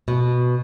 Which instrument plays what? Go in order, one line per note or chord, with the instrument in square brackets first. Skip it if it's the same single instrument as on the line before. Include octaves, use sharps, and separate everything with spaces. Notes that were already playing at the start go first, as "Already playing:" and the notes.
[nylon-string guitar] B2